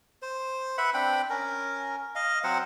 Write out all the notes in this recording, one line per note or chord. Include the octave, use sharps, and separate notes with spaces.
C5
B4 E5 F#5 B5
C4 D4 G5 B5
C#4 A#4
D#5 F5
F#3 C4 C5 F#5